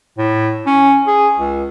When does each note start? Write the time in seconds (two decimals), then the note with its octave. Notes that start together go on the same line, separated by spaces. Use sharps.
0.18 A2
0.66 C#4
1.07 G#4
1.38 C#2